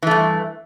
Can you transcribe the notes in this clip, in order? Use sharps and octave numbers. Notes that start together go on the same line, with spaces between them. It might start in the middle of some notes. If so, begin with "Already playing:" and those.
G2 E3 A3